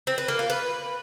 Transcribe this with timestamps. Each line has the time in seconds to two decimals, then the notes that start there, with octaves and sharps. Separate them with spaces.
0.07 C4
0.18 B4
0.28 A#3
0.39 F4
0.50 B4